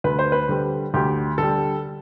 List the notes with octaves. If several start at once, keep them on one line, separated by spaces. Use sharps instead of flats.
D2 B4
C5
B4
D3 G3
D2 G4
D3 G3 A4